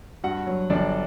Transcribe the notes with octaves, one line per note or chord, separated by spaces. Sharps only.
G2 F#4 F#5
F#3
G1 D4 D5